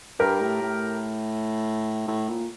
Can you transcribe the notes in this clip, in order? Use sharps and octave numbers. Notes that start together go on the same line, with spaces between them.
G2 G4 A#4
A2
A2
A2
A#2